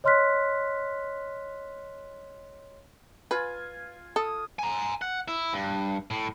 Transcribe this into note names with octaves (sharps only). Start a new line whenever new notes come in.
C#5 D#5 C6 F6 F#6 B6
F4 B4 G#5
A4 D#6
G#5 A#5
F#5
E4
G2
A2